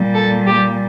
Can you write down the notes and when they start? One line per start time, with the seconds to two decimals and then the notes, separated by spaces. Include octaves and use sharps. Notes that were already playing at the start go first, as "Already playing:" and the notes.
Already playing: A#2 G3
0.13 A4
0.46 G4